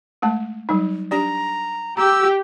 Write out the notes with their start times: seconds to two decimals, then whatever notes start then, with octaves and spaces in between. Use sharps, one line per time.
0.22 G#3 A3 A5
0.69 F#3 G3 D#4
1.11 D4 G4 D5 A#5
1.97 G4 A#5 E6